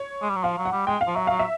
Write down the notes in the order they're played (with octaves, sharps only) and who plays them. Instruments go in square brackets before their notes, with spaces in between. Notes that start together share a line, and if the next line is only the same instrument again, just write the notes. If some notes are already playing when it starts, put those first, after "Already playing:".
Already playing: [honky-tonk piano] C#5
[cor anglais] G#3
G3
F#3
[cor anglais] F3 [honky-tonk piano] F5
[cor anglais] F#3
[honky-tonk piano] F#5
[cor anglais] G3
[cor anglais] G#3 [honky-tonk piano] G5
[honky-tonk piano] F5
[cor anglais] F3
[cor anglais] F#3 [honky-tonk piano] E5
[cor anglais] F#3 [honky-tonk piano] F5
[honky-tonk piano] E5